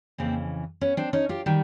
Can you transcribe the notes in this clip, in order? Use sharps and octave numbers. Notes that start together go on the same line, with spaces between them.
F2 C#3 E3 A#3 C4
B3 C#4
C4 D4
C#4 D#4
F4 G4
D#3 G3